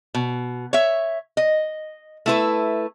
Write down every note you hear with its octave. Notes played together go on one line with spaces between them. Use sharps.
B2
C#5 E5
D#5
A3 E4 B4